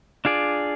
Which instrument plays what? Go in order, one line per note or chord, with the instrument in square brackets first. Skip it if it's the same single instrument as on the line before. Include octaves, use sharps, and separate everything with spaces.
[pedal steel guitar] D4 F4 G#4 D5